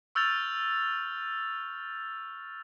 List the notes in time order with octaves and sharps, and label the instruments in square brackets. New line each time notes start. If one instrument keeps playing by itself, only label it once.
[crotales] C#6 E6 F6 G6 A6 F7